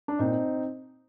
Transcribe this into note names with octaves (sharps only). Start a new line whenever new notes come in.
D4
A#2 C4 D#4